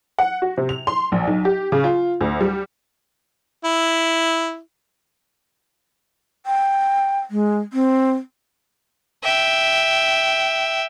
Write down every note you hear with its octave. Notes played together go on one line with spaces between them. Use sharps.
F#5
F#4
C3
F7
C6
A#1
B1
G4
C#3
F4
D2
G3
E4
G5
G#3
C4
E5 G5